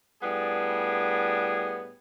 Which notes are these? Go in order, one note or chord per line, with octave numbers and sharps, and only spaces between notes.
A2 G3 B3 D4 G#4